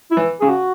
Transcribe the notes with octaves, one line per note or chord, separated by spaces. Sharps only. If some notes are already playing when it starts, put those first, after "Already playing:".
E4
E3
C#3 G#4
F#4